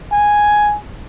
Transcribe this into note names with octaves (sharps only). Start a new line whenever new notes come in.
G#5